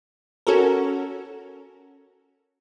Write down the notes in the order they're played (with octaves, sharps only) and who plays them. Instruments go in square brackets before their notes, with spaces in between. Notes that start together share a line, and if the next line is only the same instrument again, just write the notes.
[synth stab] C#4 F#4 A4 A#4